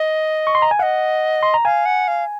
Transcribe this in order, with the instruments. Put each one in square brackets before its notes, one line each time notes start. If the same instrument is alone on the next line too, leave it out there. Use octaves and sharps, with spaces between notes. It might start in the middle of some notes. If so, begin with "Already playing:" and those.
Already playing: [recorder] D#5
[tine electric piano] C#6
C6
A#5
G#5
[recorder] D#5 F5 [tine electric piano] F#5
[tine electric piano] C6
A#5
[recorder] F5 [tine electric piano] G#5
[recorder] F#5
F5